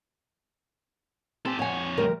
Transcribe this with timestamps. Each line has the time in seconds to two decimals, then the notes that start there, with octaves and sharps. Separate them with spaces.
1.45 C4 G4 A4
1.59 F2 C#5 F#5 G#5
1.98 D2 G3 A#4